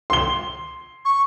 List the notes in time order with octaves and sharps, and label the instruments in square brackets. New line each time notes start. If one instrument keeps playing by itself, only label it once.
[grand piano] C6 G7
[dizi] C#6